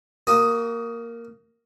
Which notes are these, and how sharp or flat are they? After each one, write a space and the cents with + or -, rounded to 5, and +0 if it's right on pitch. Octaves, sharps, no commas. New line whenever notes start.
A#3 -5 F#4 +40 D#6 +0